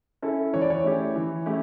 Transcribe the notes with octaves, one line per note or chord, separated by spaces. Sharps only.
C#4 E4 A4
E3 C#5
D5
C#5
A3 C#4 E4 G4
E3
A3 C#4 E4 G4